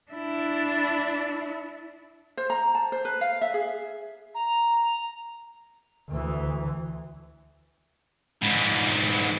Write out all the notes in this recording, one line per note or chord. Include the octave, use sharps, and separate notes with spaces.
D4 E4
C5
A#5
A5
C5
B4
F5
E5
G#4
A#5
D2 E3
G#2 E3